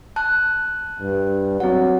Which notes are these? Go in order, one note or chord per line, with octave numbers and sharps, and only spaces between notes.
A5 F#6
G2
F#3 C4 F#5